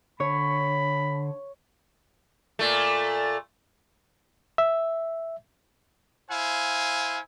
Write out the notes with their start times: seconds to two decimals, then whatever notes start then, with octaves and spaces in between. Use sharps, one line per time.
0.20 D3 C#5 B5
2.59 A#2 A3
4.58 E5
6.30 E4 C5 F5 G#5